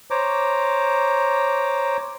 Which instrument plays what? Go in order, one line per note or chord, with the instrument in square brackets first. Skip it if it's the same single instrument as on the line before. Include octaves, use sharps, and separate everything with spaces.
[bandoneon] C5 C#5 A#5 D6